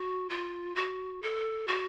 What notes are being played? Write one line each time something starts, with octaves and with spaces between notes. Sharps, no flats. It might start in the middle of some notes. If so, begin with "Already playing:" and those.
Already playing: F#4
F4
F#4
A4
F#4